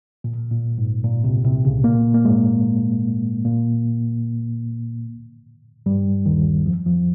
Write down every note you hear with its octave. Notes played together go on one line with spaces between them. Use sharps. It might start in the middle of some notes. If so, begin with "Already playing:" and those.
A#2
A#2
G#2
A#2
C2 C3
C2 C3
C#2 C#3
A#2 A#3
A#3
G#2 G#3
A#2 A#3
G2 G3
D#2 D#3
F2 F3
F2 F3